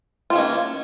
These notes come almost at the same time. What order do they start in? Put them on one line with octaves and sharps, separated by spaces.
F4 D#3 C#4 A#3